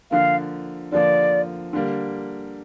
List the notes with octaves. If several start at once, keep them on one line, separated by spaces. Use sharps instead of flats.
D3 F3 A#3 F5
D3 F3 A#3 D5
D3 G3 A#3